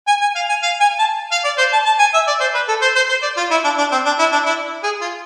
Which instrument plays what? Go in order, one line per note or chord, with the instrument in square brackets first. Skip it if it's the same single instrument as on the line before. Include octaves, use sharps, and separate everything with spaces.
[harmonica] G#5
G#5
F5
G#5
F5
G#5
A5
F5
D5
C5
A5
A5
G#5
E5
D5
C5
B4
A4
C5
C5
C5
D5
F4
E4
D4
D4
C4
D4
E4
D4
E4
G#4
F4